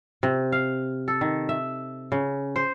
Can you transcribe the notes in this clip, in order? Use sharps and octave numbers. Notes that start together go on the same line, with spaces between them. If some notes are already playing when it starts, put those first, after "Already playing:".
C3
F5
A4
D#3
E5
C#3
C5